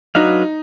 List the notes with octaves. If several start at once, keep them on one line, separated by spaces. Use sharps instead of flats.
F#3 D4 D#4 F#4 B4 F5